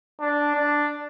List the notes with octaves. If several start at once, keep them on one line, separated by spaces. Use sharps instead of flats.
D4
D4